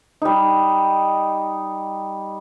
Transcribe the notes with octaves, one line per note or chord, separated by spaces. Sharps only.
G3 D#4